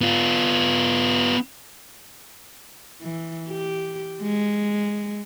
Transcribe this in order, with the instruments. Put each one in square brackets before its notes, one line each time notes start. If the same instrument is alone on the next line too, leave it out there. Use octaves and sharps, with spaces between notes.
[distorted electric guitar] B3 F4
[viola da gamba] E3
G4
G#3